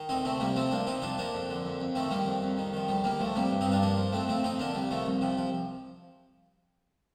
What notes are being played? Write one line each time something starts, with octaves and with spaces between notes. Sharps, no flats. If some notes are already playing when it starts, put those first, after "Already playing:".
Already playing: D#3
D2 C4 D#4
C3 A3 C4
C2 G3 A#3
F3 A3 C4
C2 A#3 D4
C3 C4 D#4
F2 D4 F4
F3 A#3 D4
F2
D3
F2
F2
D#3 A3 C4
D#3 G3 A#3
F2
F2
D#3
D#3 F3
D2 G3
D#3 G3 A#3
D2 F3 A3
C3 G3 A#3
G2
C4 D#4
G2
D4 F4
F3 A#3 D4
F3
F2 A3 C4
F3 A3 C4
F2 C4 D#4
D3 A#3 D4
C2 G3
D#3 F3 A3
C2
C3 F3
F3